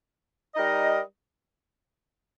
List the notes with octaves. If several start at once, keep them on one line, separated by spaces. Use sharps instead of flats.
G3 D#4 A#4 D#5